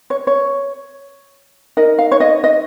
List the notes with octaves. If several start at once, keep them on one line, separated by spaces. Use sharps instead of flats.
C#5
C#5
D#4 A#4 D#5
F5
C#5
D#5
D#5